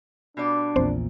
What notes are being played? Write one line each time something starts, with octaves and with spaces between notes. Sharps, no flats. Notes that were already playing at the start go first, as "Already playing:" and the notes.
B2 G3 D4 D5
A#1 E2 A#2 C4 C5